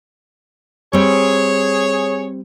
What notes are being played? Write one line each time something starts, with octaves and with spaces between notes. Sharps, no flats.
G3 C4 G#4 C#5